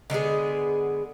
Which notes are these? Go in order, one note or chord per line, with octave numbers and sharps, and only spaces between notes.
D3 G#3 B3 G#4